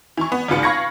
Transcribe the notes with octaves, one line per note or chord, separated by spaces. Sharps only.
E3 C#6
B3
G#1 C#2 G#2 F4 B4 C#7
F5 B5 C#6 G#6 A#6 C#7